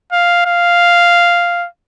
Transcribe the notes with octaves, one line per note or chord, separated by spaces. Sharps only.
F5
F5